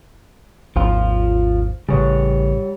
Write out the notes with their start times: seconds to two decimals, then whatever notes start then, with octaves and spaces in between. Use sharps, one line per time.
0.76 G#1 D#2 F3 F4
1.89 A1 C#3 G3 C#5